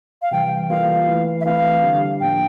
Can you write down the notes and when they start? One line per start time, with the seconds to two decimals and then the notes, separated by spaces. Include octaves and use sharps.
0.22 F5
0.31 C3 E3 G3 G5
0.70 E3 G3 A#3 F4 A4 F5
1.07 E3 A3 E4
1.41 E5
1.45 E3 A3 C4 E4 F5
1.83 D3 G3 D4 G4
2.20 A2 F3 A#3 D4 G5